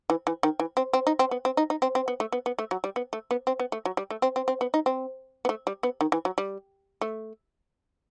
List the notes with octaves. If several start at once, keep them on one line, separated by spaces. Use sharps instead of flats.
E3
E3
D#3
E3
C4
C4
D#4
C4
B3
C4
D#4
D#4
C4
C4
B3
A3
B3
B3
A3
F#3
G3
B3
A3
B3
C4
B3
A3
F#3
G3
A3
C4
C4
C4
B3
D#4
C4
B3
A3
G3
B3
D#3
E3
F#3
G3
A3